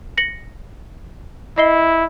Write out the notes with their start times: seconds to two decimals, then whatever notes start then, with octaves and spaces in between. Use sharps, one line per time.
0.18 A#6 C#7 F#7
1.58 E4 D#5 C7 G7